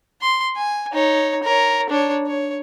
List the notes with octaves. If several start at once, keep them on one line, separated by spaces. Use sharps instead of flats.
C6
G#5
D#4 C#5
A#4 C#5
D4 C#5
C#5